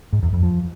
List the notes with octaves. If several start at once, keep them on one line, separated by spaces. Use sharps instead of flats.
G#2
E2
F2
F3